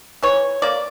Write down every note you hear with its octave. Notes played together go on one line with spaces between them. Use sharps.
E3 C#5
A#3 D5